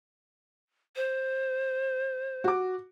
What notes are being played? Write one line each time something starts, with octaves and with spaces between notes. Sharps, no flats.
C5
F#4 D6